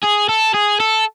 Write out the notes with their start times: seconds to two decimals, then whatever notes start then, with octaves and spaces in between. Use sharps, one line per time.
0.03 G#4
0.29 A4
0.54 G#4
0.80 A4